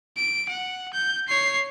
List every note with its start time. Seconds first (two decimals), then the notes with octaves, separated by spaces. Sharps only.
0.17 D7
0.49 F#5
0.93 G6
1.28 C#5 C7